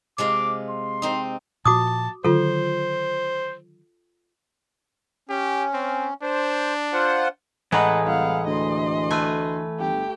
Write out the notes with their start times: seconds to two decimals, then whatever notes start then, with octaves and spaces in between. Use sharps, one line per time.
0.18 C3 G#3 F4 D6
0.70 C6
1.02 C4 D#4
1.65 A#2 F3 F#4 A5 D6 D#6
2.24 D3 D#3 F#3 F4 A4 C5
5.29 C#4 G4
5.74 C4
6.23 D4 C5
6.93 F4 C5 F#5
7.72 A2 E3 G#3 B4 D#5 F#5 A#5 B5
8.06 C2 F5 F#5
8.47 D2 D#5 C6
9.11 A3 B4 G#5
9.80 G1 G4 G5